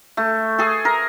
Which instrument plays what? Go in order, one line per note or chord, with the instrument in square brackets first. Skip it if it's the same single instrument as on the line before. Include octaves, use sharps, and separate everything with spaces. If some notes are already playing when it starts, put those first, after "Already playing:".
[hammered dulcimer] A3
G#4 A4
A#4